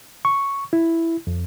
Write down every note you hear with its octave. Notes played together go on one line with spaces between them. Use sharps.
C#6
E4
F2